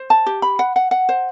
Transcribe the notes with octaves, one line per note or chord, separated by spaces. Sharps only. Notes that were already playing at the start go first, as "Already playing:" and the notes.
Already playing: C5
A5
G4
B5
F#5
F#5
F#5
C5